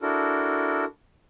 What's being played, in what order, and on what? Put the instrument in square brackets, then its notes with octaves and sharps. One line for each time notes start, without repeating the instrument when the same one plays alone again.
[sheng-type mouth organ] D4 E4 F#4 A4 A#4